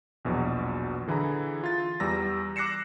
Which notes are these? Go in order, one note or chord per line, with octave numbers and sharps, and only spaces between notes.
A#1 E2 B2 F#3
D3 E3 E4 G#4 A#5
F4 A6
E2 G3 A#5 E6 A#6
D6 F#6 A#6 C7 C#7 E7